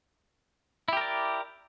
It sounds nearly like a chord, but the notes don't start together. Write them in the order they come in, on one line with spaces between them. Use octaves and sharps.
E4 G4 A#4 D5